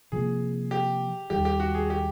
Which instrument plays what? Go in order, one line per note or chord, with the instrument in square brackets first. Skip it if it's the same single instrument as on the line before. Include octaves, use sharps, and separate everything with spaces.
[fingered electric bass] C3 F3 A#3 [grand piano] G#4
[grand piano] G4
[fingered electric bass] D#2 D#3 G3 [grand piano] G4
[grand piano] G4
F#4
G#4
G4